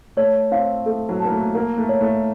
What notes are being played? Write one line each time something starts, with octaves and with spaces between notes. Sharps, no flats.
A3 C#5
C4 F5
A3 A4
F#3
A#3 A5
A3
A#3 A#4
A3
C#5
A3